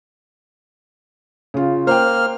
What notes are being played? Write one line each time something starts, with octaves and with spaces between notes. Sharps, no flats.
C#3 F4
A#3 C5 G5 F6